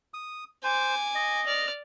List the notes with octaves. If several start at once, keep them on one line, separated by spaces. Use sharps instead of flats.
D#6
C5 G#5 D6
D#5
D5 F6